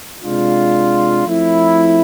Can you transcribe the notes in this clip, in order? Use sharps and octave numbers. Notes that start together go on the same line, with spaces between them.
C3 G#3 D4 F4
F3 A3 C4 E4